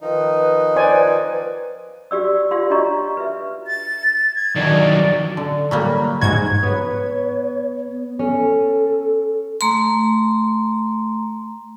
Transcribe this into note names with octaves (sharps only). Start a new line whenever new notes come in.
D#3 F3 D#4 B4
C5 D5 G#5
F#4 G4 D5 E6
F4 G4 D5 F5 C6
D4 F#4 C#5 D#5 A#5 C#6
B4 E5
A6
G#6
D#2 F#3 D5
D3
F#3 G3 A#3
G#2 F#4 G#6
B3 B4 C#5
B3
C#4 A4
A3 A#5 C6